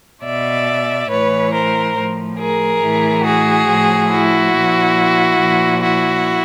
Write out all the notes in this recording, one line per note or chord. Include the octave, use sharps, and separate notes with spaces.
B2 D5 E5
A2 E3 B4 C#5
A#4 C5
A2 F3
G#4 A#4
A2 E3
F#4 G#4
A2 F3
E4 F#4
A#2 F3
A#2 F3
E4 F#4